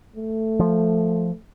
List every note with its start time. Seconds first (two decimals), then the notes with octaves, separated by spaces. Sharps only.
0.16 A3
0.60 F3